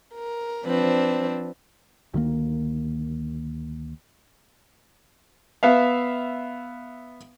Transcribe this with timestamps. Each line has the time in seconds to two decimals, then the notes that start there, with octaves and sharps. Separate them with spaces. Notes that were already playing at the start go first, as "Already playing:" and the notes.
0.15 A#4
0.65 F3 C4 D4 B4
2.14 D2 D#3 F3 A#3
5.63 B3 E5 F5